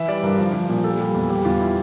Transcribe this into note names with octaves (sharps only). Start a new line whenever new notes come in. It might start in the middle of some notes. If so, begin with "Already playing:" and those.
Already playing: E3 E5
G3 D5
G2 A#4
F3
F3
A#2
G3 A4
G3
E2
G3 G4
E2 F4
E4